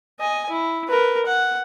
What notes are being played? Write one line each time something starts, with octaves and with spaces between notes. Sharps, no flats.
D#5 G#5
E4
A#4 B4
F#5